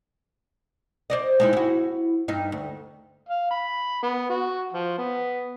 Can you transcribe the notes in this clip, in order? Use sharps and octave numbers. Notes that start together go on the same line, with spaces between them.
C5 D5 D#5
G#3 D#4 E4
E4 F#4
G2 D#4
D2
F5
B5
B3
F#4
F3
B3